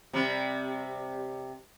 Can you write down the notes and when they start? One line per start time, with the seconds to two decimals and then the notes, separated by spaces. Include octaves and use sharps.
0.13 C3 G3